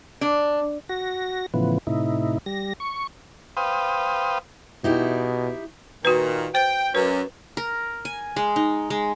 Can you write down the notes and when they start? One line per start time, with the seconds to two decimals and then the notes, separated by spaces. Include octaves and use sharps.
0.21 D4
0.89 F#4 A#6
1.54 A2 C#3 E3 F3 B3
1.87 A2 C3 D#4 E4
2.46 G3 A#6
2.80 C#6
3.57 B4 C5 F5 G5 D#6
4.84 B2 D#4 E4 G4
6.05 A#2 D#3 F#4 B4
6.55 C5 G5
6.95 F#2 C#4 B4
7.57 A#4
8.05 G#5
8.36 G#3
8.56 D#4
8.90 G#3